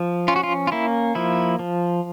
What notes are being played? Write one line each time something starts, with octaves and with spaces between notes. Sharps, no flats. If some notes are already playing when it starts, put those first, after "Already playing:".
Already playing: F3
C#4 F4
F#4
F4
F4
A#3 E4
F3 E4
F3